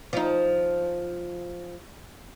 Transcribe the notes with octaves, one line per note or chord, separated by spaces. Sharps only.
F3 D#4